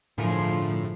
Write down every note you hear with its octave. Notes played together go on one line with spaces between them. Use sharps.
A2 D3 F3 F4 G#4 A#4